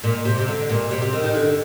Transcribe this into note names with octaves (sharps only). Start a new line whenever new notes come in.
A#2
C3
C3
D3
A#2
C3
C3
D#3
D#3
D3